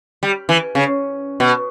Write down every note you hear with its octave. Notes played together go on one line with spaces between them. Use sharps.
G3
E3
C#3
B2